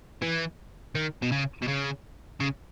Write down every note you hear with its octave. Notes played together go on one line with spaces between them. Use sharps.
E3
D#3
B2
C#3
B2
C#3
C#3